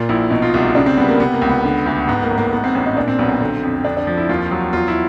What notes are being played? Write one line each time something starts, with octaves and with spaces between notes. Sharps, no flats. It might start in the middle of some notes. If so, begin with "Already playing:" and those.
Already playing: A#2 F4
A#1 E4
B2 D#4
F4
C2 F#4
D#4
C#3 D4
C4
G3 B3
A#3
C3 B3
A#3
C#2
B3
D3
D2
G#2 B3
A#3
A1
A#3
G#2 B3
C4
A1 C#4
D#4
A#2 D4
C4
B1 B3
C4
D3
F2
F2 D4
D4
F3
E4
D#2 F4
F#3
E2 F4
E4